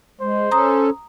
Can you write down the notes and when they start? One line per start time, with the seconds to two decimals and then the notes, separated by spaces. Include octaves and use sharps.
0.21 G#3 C5
0.51 C#4 A4 A#5 D#6